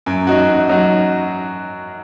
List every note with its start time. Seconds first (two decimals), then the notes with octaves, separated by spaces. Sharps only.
0.06 F#2
0.27 F#3 D#4 F#4
0.48 F#2
0.69 F#3 D#4 F#4